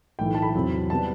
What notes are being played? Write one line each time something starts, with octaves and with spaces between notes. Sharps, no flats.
B1 A2 E3 A3 G5
A5
B5
E2 C3 F#3 C4
C3 G3 B3 A5